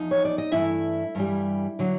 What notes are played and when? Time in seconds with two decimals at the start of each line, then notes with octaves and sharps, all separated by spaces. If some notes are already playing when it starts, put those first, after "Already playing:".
Already playing: E2 F3 D#4
0.11 C#5
0.25 D5
0.38 D#5
0.52 G2 E3 A3 E4 E5
1.15 G2 E3 G3
1.79 D3 F#3